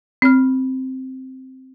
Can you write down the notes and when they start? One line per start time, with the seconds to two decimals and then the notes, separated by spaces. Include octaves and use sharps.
0.22 C4 F6